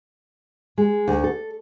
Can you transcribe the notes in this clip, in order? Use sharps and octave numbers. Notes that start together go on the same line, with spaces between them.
G#3
D2
A4